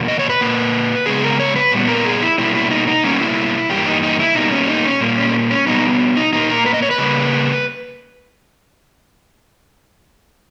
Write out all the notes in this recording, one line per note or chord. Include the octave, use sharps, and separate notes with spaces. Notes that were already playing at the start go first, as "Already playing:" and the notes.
Already playing: E2 B2 A#3
D#5
C#5
B4
A#2 A#3
C#3 G#3 B3 G#4
A#4
C#5
B4
A#2 G3 B3
A#4
G#4
E4
B2 G3 A#3 E4
E4
D#4
D#4
B2 G3 A#3 C#4
E4
G2 E3 A#3 G4
D#4
D#4
E4
B2 G3 A#3 D#4
C#4
D#4
C#4
A#2 G3 A#3
C#4
C#4
B2 G3 B3 D#4
D#4
A#2 A#3 D#4
A#4
B4
D#5
C#5
B4
C#3 G3 A#3